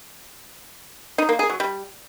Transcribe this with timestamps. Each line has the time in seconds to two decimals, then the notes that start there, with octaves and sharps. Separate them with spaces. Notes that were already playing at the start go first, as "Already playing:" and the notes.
1.18 D#4
1.29 A#3
1.39 G#4
1.49 F#3
1.60 G3